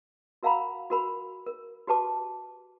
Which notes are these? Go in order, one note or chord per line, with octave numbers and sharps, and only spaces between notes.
F#4 A#4 F5 F#5 A#5 B5
F#4 A#4 B5
A#4
F#4 G4 B4 A5 D6